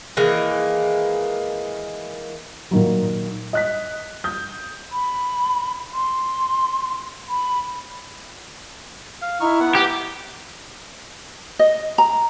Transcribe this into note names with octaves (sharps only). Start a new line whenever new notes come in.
D#3 E3 G#3 A#3
A#2 D#3 F#3
D#5 F#6 B6
D#6 G6
B5
C6
B5
F5
D#4 E4 C#6 F6
B3 F#5
G4
D#5
A#5